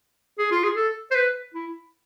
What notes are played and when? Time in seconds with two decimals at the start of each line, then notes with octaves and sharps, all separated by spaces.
0.38 G#4
0.51 F4
0.64 G#4
0.76 A4
1.11 C5
1.16 B4
1.54 E4